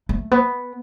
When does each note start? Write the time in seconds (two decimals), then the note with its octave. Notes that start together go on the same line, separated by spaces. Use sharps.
0.09 A3
0.31 B3